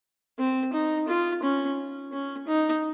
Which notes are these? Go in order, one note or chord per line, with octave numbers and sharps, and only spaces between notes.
C4
D#4
F4
C#4
C#4
D#4